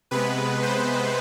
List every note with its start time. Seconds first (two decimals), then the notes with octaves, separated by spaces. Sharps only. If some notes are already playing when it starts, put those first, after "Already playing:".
0.11 C3 G#3 B3 B4
0.63 C5